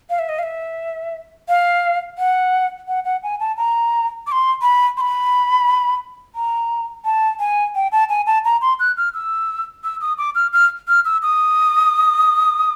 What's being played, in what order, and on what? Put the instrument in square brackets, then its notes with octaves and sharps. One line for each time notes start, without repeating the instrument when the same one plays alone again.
[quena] F5
E5
D#5
F5
E5
F5
F#5
F#5
F#5
G#5
A5
A#5
D6
C6
B5
C6
B5
A#5
A5
G#5
G5
A5
G#5
A5
A#5
C6
F#6
F6
E6
E6
D#6
D6
F6
F6
F6
E6
D#6